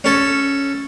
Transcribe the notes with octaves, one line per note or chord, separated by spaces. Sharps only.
C#4 A4